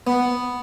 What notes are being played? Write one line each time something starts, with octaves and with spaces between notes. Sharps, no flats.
B3